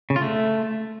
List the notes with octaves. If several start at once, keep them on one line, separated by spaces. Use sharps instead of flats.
C#3
F4
A3